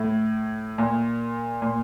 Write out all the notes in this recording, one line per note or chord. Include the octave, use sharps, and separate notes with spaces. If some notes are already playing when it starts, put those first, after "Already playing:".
Already playing: A2
A#2
A#2